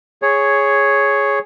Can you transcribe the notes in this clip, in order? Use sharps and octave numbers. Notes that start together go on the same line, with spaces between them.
G#4 C#5